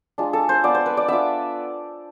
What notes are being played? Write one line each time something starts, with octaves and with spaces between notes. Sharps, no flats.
G#3 D4 F4
A4
C5
B3 F4 D5
C5
B4
D5
B3 D4 F4 E5